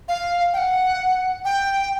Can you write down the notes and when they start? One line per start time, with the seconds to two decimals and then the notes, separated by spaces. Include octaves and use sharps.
0.08 F5
0.53 G5
0.58 F#5
1.45 G5